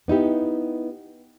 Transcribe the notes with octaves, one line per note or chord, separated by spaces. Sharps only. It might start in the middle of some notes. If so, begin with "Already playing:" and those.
B3 D#4 E4 G4